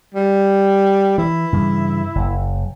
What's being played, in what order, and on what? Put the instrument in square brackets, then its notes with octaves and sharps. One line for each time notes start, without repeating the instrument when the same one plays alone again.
[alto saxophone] G3
[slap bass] E3 [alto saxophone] E4
[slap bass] G2 C#3 E3
F#1